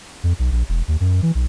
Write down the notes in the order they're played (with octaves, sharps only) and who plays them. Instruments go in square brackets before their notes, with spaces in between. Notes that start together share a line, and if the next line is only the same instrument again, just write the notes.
[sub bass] F2
B1
A#1
E1
D#2
F#2
E3
B1